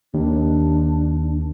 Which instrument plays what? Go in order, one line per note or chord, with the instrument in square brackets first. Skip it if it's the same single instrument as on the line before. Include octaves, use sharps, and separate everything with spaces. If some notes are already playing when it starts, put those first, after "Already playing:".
[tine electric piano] D#2 [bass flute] D4